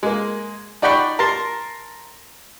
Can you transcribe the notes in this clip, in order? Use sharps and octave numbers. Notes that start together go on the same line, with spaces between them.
G#3 A#3
D#4 D5 F#5 G5 B5 C#6
A#4 A5 C6